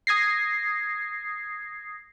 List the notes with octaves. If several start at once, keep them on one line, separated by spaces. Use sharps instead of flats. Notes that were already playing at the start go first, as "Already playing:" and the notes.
D#6 G#6 A#6 C7